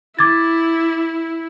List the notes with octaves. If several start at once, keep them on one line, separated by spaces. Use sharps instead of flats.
E4 D6 G#6 A6